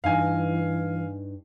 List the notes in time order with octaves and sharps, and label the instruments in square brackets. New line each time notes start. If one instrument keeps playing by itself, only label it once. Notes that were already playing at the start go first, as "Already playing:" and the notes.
[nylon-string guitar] G2 D4 D#4 [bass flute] E3 [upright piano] F5 G#5